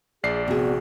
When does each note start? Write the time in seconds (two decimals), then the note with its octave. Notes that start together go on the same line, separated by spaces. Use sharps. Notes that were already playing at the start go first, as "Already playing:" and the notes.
0.23 A#1 G#4 D5 C7
0.48 C3 B3 F#4 G#4